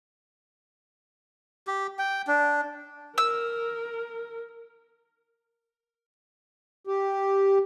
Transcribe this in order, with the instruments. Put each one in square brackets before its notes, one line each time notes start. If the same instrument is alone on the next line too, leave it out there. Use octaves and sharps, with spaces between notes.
[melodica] G4
G5
D4
[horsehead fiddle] A#4 [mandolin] E6
[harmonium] G4